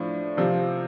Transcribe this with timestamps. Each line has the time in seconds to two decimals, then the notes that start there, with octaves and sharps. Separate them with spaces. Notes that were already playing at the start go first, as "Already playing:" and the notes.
Already playing: A2 F3 D4
0.37 C3 F3 C4